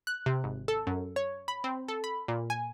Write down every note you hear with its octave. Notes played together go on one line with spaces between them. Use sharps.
F#6
C3
G#1
A4
F#2
C#5
B5
C4
A4
B5
A#2
G#5